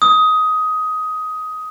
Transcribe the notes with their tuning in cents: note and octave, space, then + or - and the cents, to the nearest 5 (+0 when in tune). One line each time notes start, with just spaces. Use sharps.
D#6 +15